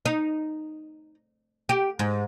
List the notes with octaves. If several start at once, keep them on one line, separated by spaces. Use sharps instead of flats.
D#4
G4
G#2